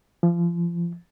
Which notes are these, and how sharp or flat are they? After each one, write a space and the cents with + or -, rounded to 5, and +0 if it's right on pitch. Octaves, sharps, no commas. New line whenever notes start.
F3 -30